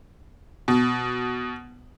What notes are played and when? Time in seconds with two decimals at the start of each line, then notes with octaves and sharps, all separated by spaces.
0.68 B2